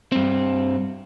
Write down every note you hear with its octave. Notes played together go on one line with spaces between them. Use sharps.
G2 C4